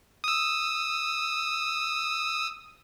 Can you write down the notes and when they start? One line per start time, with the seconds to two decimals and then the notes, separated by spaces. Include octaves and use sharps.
0.24 D#6 E6